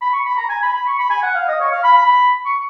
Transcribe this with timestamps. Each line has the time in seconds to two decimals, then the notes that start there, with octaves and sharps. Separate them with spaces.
0.01 B5
0.13 C#6
0.25 B5
0.37 A#5
0.49 G#5
0.63 B5
0.74 B5
0.87 C#6
0.99 B5
1.11 G#5
1.23 F#5
1.35 F5
1.48 D#5
1.61 C#5
1.72 F5
1.84 B5
1.97 B5
2.46 C#6